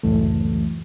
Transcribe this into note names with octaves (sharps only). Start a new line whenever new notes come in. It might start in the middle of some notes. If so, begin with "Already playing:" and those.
C#2 F#2 A2 E3 A3